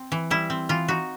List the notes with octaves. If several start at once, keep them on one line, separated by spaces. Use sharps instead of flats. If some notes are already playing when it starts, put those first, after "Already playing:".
Already playing: C4
E3
G3 E4
C4
E3 F4
D#4 F#4